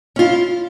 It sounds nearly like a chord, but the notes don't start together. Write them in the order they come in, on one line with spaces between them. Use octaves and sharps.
C#4 F4 E4